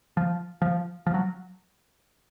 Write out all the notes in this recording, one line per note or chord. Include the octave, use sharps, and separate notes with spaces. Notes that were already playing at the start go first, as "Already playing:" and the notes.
F3
F3
F3
F#3